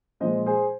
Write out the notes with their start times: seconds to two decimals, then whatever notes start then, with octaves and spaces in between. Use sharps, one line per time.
0.20 A#2 F3 G#3 C5 D#5
0.46 G#4 C5